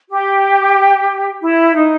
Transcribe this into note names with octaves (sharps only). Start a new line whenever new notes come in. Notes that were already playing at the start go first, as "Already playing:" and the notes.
G4
E4
D#4